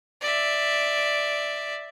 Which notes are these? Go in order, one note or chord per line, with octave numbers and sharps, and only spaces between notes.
D5 E5